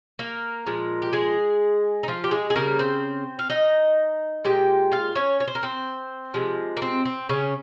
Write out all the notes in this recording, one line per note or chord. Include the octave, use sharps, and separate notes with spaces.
A#3 A#4
A#2 F3 G#3
G4
G#3 G#4
D#4
F3 F4
G4
G#3 G#4
G#4
C#3 G3 A#3 A#4
C4 C5
F5
D#4 D#5
A#2 G#3 G4 G5
F4 F5
C#4 C#5
C#5
C5
A#4
C4 C5
C3 F3 G#3
A#3
C4
C4
C#3 C#4